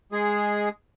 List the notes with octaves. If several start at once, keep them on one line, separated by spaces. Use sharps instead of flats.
G#3 G#4